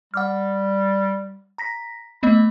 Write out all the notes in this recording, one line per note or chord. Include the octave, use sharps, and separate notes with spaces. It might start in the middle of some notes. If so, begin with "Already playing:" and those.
G3 F#5 D6 F6
A#5 A#6 B6
A3 B3 D#5 B5